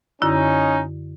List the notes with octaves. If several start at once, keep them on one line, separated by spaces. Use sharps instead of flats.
F#2 D3 C#4 D#4 E4